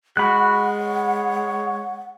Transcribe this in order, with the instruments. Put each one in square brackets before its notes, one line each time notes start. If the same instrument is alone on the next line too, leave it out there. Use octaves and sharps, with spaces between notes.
[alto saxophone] G#3 [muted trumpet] F#4 [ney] F#5 [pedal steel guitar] B5 F#6
[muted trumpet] C#5